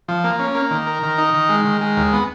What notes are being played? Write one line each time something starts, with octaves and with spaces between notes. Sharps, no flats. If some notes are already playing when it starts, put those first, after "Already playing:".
F3
A#3
C#4
A#3
D#3
A#4
D#3
D#4
D#3
G#3
D#3
G#3
D#2
B3